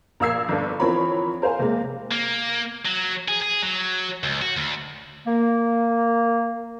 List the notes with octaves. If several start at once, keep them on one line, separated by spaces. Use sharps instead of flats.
A#1 A#4 F5 E6 G#6 C7
G1 D4 A4
E3 F3 C4 A#4 C#5 B5
A#4 C5 F5 G#5
C3 G#3 A#3
A#3
F#3
G#4
G#4
F#3
C#2
F#4
D2
A#3